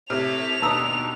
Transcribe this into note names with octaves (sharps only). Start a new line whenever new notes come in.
A2 C3 A4 C#5 E5 F6 F7
D#2 B2 D4 D#4 A5 A#5 D#6 E6